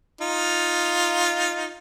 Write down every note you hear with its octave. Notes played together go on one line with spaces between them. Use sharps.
D#4 F4